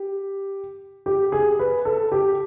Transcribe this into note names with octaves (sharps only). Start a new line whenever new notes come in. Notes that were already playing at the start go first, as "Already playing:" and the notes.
Already playing: G4
G4
G#4
B4
A4
G4